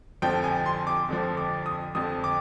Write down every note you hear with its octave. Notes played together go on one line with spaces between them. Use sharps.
F2 D3 F3 G5
G#5
C6
D6
F2 D3 F3
D6
D#6
F2 D3 F3 D#6
D6